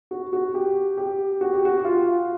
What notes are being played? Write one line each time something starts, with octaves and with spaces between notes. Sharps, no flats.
F#4
F#4
G4
G4
F#4
G4
F#4
F4